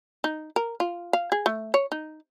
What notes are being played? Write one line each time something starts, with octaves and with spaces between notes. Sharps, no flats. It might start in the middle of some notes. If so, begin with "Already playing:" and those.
D#4
A#4
F4
F5
G#4
A3
C#5
D#4